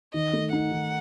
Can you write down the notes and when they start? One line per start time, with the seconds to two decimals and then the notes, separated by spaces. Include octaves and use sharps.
0.14 D#3 D#5
0.33 A3
0.53 D#4 F#5
0.72 D#3